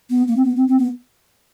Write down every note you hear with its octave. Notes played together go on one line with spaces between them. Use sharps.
B3
A#3
C4
B3
C4
C4
B3